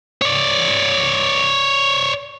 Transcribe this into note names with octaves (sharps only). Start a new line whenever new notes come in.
C#5 D5